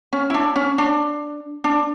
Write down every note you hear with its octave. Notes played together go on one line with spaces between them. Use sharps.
C#4
E4
D4
C#4
D4
D4